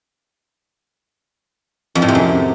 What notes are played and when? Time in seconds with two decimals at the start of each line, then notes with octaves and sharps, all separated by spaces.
1.95 F2
2.02 A2
2.08 C3
2.15 F#2